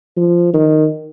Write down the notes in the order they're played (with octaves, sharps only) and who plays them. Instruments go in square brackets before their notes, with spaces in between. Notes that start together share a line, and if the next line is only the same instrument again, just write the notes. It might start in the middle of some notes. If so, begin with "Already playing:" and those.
[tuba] F3
D#3